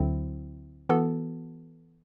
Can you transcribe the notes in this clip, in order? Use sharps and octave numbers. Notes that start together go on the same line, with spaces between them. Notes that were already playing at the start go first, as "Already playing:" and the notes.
Already playing: D2 D3 F#3 C4 E4
E3 B3 F#4 A4